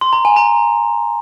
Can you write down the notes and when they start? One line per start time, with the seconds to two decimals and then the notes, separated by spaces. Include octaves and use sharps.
0.01 C6
0.13 A#5
0.25 G#5
0.36 A#5